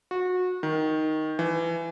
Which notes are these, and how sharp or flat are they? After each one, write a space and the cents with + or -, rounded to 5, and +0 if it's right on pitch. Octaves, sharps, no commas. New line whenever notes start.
F#4 -25
D#3 +5
E3 +20